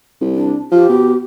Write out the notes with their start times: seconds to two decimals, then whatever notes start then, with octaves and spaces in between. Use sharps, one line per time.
0.21 C2
0.35 D4
0.72 F3 G4
0.89 B2